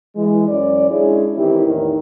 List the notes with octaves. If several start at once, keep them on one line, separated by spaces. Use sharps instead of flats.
E3 G#3
F#2 C#4 D5
G#3 C#4 D4 E4 G#4
D#3 E3 C4 E4 G4
E2 A2 D#3